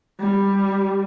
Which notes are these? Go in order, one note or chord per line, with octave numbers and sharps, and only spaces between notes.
G3